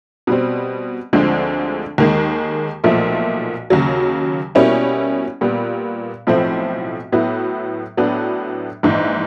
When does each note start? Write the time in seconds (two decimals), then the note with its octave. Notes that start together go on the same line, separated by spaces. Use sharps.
0.27 B2 G3 C4
1.13 D2 D3 F3 G#3 C4
1.98 D#2 D#3 G#3
2.84 B1 A#2 F3 A3
3.70 D#2 C#3 F#3
4.55 B2 G3 A#3 C#4 E4
5.41 A#2 G3 B3
6.27 B1 A2 F3 A3 C4
7.12 A2 F#3 B3 E4
7.97 A2 F#3 B3 D4
8.83 A#1 G#2 E3